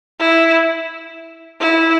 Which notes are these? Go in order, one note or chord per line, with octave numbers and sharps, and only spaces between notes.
E4
E4